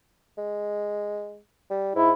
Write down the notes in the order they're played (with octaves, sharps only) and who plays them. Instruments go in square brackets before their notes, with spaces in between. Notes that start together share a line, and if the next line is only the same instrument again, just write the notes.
[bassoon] G#3
G3
[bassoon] G#2 [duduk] E4